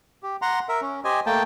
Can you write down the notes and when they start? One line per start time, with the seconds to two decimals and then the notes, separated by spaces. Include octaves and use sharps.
0.23 G4
0.42 F#5 A#5 C6
0.69 A#4 E5
0.82 C#4
1.04 G4 C5 D#5 G#5
1.26 A3 A#3 G5 A5